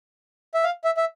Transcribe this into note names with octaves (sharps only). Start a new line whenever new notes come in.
E5
F5
E5
E5